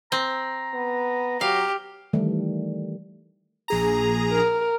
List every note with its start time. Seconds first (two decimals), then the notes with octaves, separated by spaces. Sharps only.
0.12 C4 A#5
0.74 B3
1.41 F#3 G4 F5
2.13 D#3 E3 G3 A3
3.68 A#1 G#4 A#5
4.32 A#4